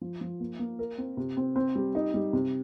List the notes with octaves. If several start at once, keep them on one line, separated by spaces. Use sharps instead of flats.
F3
F3
A#3
A#3
A#4
C4
C3
C4
C4
G3
D#4
G3
C3